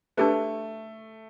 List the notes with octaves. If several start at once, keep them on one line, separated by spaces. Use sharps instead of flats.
A3 D4 G4 B4